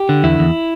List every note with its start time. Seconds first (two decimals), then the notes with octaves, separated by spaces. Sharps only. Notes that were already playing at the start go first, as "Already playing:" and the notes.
Already playing: G4
0.09 D3
0.23 E2 E4
0.39 E2